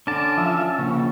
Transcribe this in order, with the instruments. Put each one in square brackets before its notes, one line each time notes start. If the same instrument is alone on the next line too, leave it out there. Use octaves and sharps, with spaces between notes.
[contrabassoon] D3 [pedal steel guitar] C#4 A5 [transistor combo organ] D6
[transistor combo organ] F3 E5
[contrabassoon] A#1 [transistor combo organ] C#3